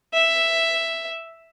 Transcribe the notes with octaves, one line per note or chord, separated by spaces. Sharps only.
E5